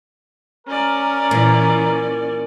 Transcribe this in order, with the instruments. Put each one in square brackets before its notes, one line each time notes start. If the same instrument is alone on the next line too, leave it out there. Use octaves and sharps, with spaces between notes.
[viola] C#4 D5 [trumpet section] A#4
[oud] A#2 [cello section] E3